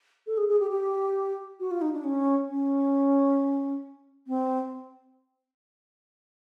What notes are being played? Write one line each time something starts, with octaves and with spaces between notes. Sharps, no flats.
A4
G#4
G#4
G4
G4
F#4
F4
D#4
D4
C#4
C#4
C4